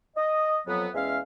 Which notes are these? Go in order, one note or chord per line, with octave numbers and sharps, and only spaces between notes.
D#5
F2 F#3 B3
E2 G#3 C#4 E5 F5